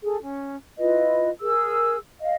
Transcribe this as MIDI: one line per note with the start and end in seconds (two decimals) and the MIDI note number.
0.03 0.17 68
0.03 0.17 69
0.22 0.56 61
0.78 1.29 64
0.78 1.29 65
0.78 1.29 71
0.78 1.29 75
1.41 1.96 68
1.41 1.96 70
1.41 1.96 88
2.20 2.35 75
2.20 2.35 77